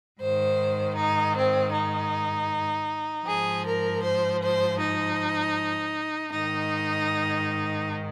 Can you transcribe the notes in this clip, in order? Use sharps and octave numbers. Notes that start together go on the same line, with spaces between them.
G#2 D#3 C5
D#4
C4
D#4
G#2 F3 G#4
A#4
C5
C5
D#4
G#2 D#3 D#4